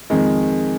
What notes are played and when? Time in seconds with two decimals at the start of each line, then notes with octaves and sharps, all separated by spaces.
0.10 F2 D#3 G#3